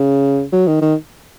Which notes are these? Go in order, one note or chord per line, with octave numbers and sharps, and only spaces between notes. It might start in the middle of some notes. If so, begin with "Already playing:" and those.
Already playing: C#3
F#3
D#3
D#3